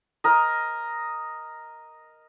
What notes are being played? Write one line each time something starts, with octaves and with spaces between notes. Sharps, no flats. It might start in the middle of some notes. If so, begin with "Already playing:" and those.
A#4 D#5